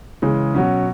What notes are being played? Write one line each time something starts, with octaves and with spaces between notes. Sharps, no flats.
C#3 E3 G#3
B2 F#3 C#4